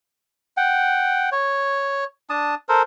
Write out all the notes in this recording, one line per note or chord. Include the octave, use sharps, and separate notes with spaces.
F#5 G5
C#5
D4 A5 D#6
A4 A#4 C5